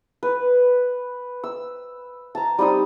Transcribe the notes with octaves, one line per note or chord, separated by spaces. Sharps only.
B4
E6
A5 A#5
G3 C4 D#4 D#6